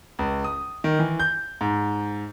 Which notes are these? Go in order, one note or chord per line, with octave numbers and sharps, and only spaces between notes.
C#2
D#6
D#3
E3
G6
G#2